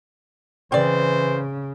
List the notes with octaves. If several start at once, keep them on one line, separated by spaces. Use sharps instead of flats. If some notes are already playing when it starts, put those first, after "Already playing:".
C#3 E3 C4 C5 D5